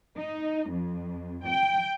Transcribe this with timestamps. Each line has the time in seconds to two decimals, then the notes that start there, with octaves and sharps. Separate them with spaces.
0.16 D#4
0.70 F2
1.45 G5